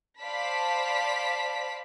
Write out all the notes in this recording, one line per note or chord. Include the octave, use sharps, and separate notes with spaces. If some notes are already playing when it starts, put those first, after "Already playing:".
C5 D5 F5 A5 B5 B6